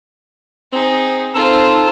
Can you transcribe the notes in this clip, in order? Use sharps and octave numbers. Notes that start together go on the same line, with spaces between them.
C4 D#4 G#4
C4 D#4 F4 A4 C5 A5